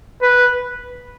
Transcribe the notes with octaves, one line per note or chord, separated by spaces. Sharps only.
B4